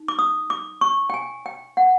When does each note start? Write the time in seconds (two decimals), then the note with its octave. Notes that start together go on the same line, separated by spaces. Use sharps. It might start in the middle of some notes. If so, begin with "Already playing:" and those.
Already playing: D#4
0.08 D6
0.19 D#6
0.50 D6
0.81 C#6
1.10 G5
1.14 G#5
1.46 G5
1.77 F#5